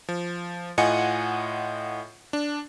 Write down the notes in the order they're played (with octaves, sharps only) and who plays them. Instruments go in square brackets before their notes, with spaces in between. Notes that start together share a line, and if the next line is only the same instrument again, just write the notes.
[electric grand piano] F3
A2 F4 D#5 F#5 G#5 C#7
D4